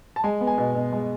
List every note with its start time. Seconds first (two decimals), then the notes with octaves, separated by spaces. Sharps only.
0.16 A5
0.24 G#3 G#5
0.41 B3
0.47 G#5
0.58 B2
0.75 B2
0.92 G#3